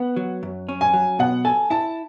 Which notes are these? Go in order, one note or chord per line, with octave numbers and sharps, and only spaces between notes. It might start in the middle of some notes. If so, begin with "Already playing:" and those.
Already playing: B3 F#5
F#3
F#2
C#4
G#5
F#3
B2 F#5
A4 G#5
E4 A5